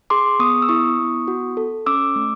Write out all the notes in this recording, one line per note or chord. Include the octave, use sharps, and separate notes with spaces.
G#4 C6 D6
B3 C#6 D#6
E6
E4 C#6 D#6
B3
F#4
A4
C#4 D6 E6
A3